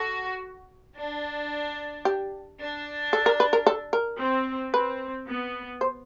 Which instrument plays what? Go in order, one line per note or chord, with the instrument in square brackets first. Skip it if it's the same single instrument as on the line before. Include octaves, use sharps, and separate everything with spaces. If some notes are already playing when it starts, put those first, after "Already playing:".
Already playing: [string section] F#4 [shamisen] A4
[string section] D4
[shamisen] G4
[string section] D4
[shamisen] A4
A#4
B4
A#4
A4
A#4
[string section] C4
[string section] C4 [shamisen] B4
[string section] B3
[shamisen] C5